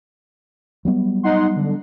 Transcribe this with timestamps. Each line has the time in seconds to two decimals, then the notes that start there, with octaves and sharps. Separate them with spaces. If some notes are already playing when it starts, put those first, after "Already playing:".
0.85 F#3 G3 B3
1.23 D#4 F#5 C6
1.56 D3